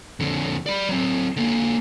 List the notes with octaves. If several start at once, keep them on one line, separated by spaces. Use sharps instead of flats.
F2 D3
D5 B5
F#3 C4
D3 A#3